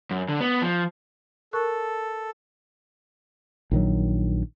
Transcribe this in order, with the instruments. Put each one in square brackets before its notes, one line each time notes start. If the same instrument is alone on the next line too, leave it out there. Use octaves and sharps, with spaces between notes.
[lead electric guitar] F#2
D3
B3
F3
[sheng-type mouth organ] A4 [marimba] A#4 C#6 F#6
[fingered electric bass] A#1 D#3 F#3